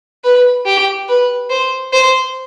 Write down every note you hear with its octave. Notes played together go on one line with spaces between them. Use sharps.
B4
G4
B4
C5
C5